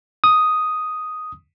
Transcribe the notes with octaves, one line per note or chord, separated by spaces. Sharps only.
D#6